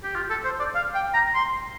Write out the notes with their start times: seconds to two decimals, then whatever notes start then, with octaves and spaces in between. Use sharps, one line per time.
0.04 G4
0.15 F4
0.30 A4
0.44 C5
0.60 D5
0.75 F5
0.94 G5
1.14 A#5
1.34 C6